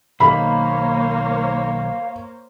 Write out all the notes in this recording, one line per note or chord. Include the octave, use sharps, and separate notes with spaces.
B1 D#3 A#3 C5 C#5 F5 B5